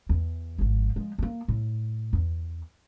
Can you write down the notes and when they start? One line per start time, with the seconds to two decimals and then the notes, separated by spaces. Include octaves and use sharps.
0.09 E2
0.58 G#1 F3
0.96 F3 G#3
1.18 G#3 A#3
1.48 A2
2.13 E2